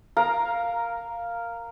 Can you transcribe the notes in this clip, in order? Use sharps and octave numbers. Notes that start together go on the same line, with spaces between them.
A#4 F5 A#5